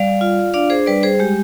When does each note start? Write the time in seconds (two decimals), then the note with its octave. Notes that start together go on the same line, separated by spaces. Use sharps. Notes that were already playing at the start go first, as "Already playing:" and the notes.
Already playing: G3 D5 F5
0.21 F4
0.54 D4 D5 F5
0.70 G#4 C5
0.86 G3 B4 D5
1.03 G#4 C5
1.20 G#3 G4